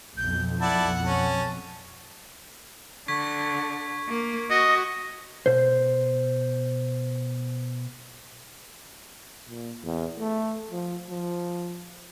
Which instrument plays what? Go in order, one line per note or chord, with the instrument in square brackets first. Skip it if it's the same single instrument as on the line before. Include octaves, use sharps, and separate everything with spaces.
[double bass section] B1 F2 [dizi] G6
[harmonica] E4 D5 [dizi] F#5 [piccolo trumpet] A5
[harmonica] C#4 [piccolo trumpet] A5
[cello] D3 [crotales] C#6 G#6 B6
[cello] A#3
[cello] F#4 [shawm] D#5
[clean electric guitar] B2 C5
[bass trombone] A#2
E2
A3
F3
F3